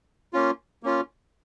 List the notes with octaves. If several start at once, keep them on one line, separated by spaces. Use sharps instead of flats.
A#3 C#4 F4
A#3 C#4 F4